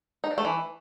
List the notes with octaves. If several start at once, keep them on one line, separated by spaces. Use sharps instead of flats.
D#4
D4
A3
E3